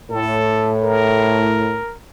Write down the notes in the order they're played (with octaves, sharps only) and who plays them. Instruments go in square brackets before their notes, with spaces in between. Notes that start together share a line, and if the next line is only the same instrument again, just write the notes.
[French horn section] A2 [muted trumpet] A4
[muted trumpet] A#4